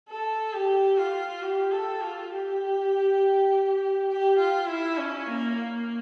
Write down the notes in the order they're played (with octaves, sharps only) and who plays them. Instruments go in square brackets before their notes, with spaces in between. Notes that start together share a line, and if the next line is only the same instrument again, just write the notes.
[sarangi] A4
G4
F4
G4
A4
F4
G4
G4
F4
E4
C#4
A#3
A#3